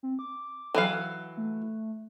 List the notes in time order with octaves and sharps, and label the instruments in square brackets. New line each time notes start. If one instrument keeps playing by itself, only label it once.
[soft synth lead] C4
D6
[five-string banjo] E3 F#3 F5 [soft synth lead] F#5
[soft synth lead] A3